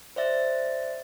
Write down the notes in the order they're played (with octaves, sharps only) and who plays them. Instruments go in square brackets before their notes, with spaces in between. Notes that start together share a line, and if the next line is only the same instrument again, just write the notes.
[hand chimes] C5 D5 E5 A6